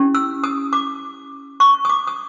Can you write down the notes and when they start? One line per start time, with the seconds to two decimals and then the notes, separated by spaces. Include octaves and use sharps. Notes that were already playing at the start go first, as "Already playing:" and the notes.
Already playing: C#4 E4 G4
0.15 E6
0.44 D#6
0.73 D6
1.60 C#6
1.85 D#6
1.89 D6
2.07 D#6